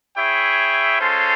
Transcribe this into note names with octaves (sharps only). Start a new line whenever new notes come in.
E4 G#4 C#5 E5 G5
G#3 C#4 F4 A4 C5